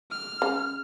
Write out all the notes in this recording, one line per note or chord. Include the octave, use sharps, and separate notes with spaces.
F6
C#3